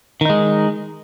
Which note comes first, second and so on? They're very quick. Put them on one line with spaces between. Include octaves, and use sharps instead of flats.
D#3 D#4 G#3